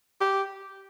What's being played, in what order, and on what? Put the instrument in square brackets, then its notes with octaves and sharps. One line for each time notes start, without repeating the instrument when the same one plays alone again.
[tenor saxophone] G4